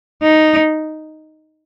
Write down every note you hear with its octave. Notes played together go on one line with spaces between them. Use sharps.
D#4